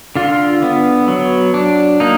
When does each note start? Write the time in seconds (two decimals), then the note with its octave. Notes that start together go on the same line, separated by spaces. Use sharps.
0.15 D3 F4
0.63 B3
1.08 F#3
1.54 D4
2.00 A#3 D#4